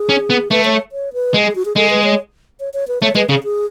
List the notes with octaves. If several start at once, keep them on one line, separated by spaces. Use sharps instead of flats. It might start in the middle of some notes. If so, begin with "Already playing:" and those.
Already playing: G#4
C#4
B3
A3 B4
C#5
C#5
B4
G#3
G#4
F#4
G#4
G#3 A4
B4
C#5
C#5
C#5
B4
A3 C#5
G#3 B4
C#3 G#4
G#4